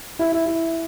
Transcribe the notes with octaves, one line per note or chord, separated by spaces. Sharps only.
E4
E4
E4